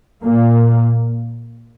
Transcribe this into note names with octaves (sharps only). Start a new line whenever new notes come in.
A#2 A#3